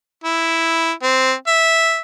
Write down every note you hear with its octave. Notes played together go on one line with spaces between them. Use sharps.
E4
C4
E5